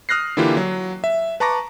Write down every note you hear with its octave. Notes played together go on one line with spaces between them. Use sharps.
D#6 F6 F#6 A#6 C7
D3 E3 A#3 E4 F4 G4
F#3
E5
B4 A5 A#5 C#6 D6 A#6